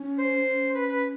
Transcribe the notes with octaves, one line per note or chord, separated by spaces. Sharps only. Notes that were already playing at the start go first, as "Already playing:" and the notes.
Already playing: C#4
C5
C#4
B4
B4